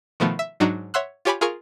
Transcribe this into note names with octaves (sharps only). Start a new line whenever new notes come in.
B2 D#3 F3 A3 B3
E5
G#2 F#3 D4 D#4 F#4
C#5 E5 F#5 C6 E6 F#6
F4 G4 C#5 G#5 B5 D6
F4 G#4 A#4 F5 C#6 F6